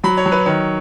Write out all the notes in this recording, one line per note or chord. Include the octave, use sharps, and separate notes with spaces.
F#3 B5
C#5
F#3
B4
D#3 C#5